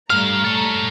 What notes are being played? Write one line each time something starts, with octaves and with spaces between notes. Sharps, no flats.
G2 G3 A3 F5 A#5 F6
A4 C#5